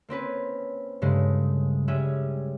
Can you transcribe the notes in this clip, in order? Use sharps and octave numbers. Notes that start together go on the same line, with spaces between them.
A#3 C4 C#4 B4
G2 C#3 G#3 A3
G3 G#3 C#4 G#4 E5